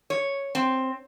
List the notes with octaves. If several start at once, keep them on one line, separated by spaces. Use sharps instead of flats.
C#5
C4